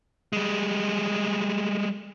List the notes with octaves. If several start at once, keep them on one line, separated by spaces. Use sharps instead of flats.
G3 G#3